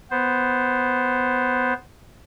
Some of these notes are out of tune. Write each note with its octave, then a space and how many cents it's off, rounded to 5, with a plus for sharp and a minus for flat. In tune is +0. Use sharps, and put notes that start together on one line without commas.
B3 +5 C5 +0